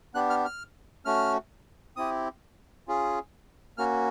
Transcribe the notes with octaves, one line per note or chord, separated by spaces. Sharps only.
B3 D4 G4 F#6
F6
F6
A3 C#4 F#4 F6
C4 E4 G4 D#6
C#4 F4 G#4
A#3 C#4 F#4 F6